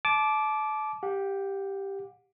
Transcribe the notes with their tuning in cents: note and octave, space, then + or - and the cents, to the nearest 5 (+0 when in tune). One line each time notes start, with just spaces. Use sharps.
A5 -30 D6 +0
G4 +0 F#5 -40